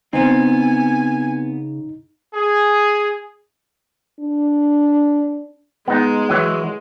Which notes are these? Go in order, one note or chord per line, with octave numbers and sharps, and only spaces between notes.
C#3 B3 C4 D#4 G#5
G#4
D4
G#3 B3 D#4
E3 F#3